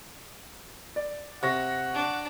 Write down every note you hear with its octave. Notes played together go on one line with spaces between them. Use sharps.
D5
C3 F#5 C#6 A#6
D4